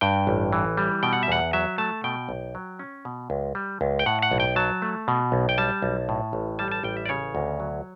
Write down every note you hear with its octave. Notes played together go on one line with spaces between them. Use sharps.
G2 G5
A1
E3
G3
B2 G5
F#5
E5
E2 F#5
F#3 E5
A3 A5
B2 G5
B1
F#3
C#4
B2
C#2
G3
C#2
G5
A2 F#5
F#5
B1
G5
F#3 A5
A3
B2
B1
G5
G3 A5
B1
A2
A1
G3 A5
A5
A1 G5
E5
D5
C#3 C#5
D2
F#3